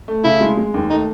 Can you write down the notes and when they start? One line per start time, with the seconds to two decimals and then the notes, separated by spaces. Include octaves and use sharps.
0.08 A3
0.24 C#3 E4
0.41 G#3
0.57 G#3
0.74 D#2
0.90 A3 D#4